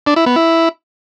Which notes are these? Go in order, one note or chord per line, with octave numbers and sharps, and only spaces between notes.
D4
E4
B3
E4